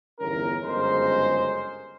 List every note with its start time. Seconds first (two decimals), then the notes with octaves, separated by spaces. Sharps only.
0.20 G1 E2 C#4 A#4
0.63 G1 F#2 C#3 G#3 A#4 C5